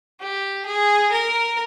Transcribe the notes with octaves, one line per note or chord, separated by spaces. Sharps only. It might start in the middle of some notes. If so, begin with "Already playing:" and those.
G4
G#4
A#4